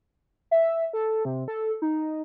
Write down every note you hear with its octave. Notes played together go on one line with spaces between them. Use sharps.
E5
A4
C3
A4
D#4